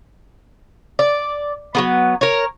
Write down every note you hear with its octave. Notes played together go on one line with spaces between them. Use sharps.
D5
F#3 G3 B3
A#4 C#5